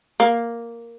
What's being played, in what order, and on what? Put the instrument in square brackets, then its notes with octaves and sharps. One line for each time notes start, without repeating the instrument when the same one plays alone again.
[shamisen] A#3